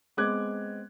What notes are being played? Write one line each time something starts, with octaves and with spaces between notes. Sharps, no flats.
G#3 B3 C4 D6 F#6 G#6